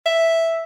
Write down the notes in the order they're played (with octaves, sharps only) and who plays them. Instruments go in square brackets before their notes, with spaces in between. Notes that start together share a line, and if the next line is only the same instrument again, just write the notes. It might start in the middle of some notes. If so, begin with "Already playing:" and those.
[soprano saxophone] E5